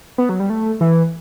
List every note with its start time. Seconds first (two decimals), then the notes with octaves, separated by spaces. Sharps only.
0.18 B3
0.29 F#3
0.40 G3
0.50 A3
0.81 E3